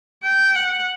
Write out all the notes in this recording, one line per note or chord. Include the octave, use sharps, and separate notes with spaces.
G5
F#5